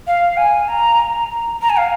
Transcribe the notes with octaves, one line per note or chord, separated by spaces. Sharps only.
F5
G#5
A#5
A#5
G#5
F5